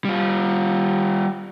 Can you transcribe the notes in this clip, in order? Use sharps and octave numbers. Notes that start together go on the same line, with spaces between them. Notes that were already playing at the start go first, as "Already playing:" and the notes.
G3 F4